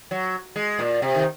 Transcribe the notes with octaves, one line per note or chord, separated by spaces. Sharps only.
F#3
G#3
A#2
C3
D#3